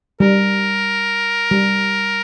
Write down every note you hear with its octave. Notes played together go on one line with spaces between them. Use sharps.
G3 A#4
G3